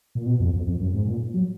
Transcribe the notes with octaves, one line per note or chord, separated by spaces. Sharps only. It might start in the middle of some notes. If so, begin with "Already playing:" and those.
A#2
B2
F2
F2
F2
F#2
G#2
A#2
F#3